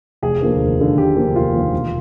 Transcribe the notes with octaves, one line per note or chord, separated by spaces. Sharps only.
F1 G#4
D#2 D3 F3 A#3
F1
D#2 D3 F3 A#3
F1 G4
D#2 D3 F3 A#3
F1 F4
D#2 D3 F3 A#3
E1